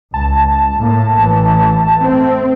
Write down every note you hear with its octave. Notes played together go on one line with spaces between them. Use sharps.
C#2 A5
A2 A#3
A1 E3
A3 C4